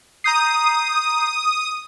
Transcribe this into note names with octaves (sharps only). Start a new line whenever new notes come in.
A#5 D#6 G6 C7